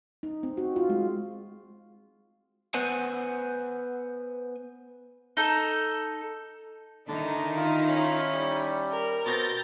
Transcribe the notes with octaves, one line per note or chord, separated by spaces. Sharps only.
D#4
C4
F#4
F4
G#3
B3 B4 C5 F#5 G#5
D#4 A4
D3 D#3 D#4 E4 A#5
F4
C#4
G3
A#4
B2 C4 G6 A6 A#6